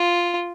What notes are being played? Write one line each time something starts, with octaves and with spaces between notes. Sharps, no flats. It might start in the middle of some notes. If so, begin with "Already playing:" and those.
Already playing: F4